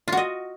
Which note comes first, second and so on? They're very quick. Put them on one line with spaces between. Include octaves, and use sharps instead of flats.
F4 F#4 D#5